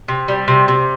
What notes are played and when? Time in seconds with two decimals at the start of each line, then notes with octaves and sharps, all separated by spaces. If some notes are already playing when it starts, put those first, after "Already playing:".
0.08 C3
0.28 G3
0.48 C3
0.68 C3